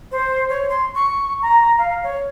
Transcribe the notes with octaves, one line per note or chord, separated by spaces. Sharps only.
C5
C#5
C6
C#6
A#5
F5
C#5